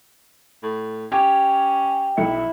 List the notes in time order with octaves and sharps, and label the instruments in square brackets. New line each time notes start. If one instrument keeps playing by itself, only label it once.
[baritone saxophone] A2
[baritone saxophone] C#4 [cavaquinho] G4 [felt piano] G#6
[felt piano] B1 E5 C#7 [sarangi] E4